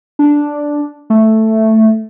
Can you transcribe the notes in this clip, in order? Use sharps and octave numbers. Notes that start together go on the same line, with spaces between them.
D4
A3